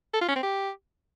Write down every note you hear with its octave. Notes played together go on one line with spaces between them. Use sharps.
A4
F4
C#4
C4
G4